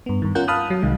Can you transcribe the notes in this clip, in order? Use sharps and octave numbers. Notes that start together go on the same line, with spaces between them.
G2 B3
G2 D#3
C#4 F4 A#4 F#5 G6
F5 A5 B5 D#6 F6 F#6
F#3
C2 D#3 G#3